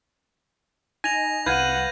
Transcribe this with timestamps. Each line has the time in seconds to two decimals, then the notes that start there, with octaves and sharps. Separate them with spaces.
1.04 D#4 G#5 A#6 F7
1.46 C2 B4 F5 F#5 G6 G#6 D#7